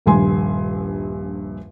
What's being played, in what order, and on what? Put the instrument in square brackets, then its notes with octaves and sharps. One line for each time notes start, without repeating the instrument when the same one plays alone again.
[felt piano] D#1 A#1 G2 G#5 C6